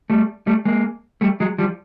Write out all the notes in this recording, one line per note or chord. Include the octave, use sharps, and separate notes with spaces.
G3 A3
G3 A3
G#3 A#3
G3 A3
F#3 G#3
F3 G3